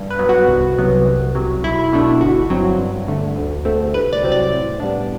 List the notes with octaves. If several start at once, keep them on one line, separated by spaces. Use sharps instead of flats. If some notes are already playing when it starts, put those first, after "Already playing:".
Already playing: G2
B4
F#3 B3
F#4
C2
C3 F#3 B3
C2
C3 F#3
B1 E4
B2 A3 D4
G1 F#4
G2 F#3 C4
G2
D3 A3
D2
D3 A3 C4
C2 B4
D5
C3 F#3 C4
D5
A2
G3 B3 D4